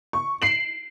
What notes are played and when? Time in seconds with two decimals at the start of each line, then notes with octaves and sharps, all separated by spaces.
0.13 C#6
0.42 C7 D7 E7 F#7